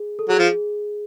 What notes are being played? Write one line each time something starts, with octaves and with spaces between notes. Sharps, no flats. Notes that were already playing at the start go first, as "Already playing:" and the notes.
Already playing: G#4
A4
F#3 G#4
F3